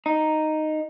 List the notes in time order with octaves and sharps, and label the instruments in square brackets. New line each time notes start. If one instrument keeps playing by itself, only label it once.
[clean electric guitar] D#4